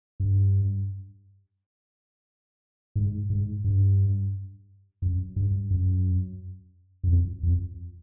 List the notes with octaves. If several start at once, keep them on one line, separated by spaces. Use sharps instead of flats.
G2
G#2
G#2
G2
F#2
G2
F#2
F#2
F2
F2